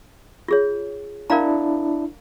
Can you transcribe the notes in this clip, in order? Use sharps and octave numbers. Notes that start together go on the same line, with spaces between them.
F4 G#4 C#5
D4 E4 A#4 D5 F5 A#5